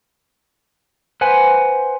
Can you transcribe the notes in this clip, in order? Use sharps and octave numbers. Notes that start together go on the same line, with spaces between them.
B4 C5 F#5 G#5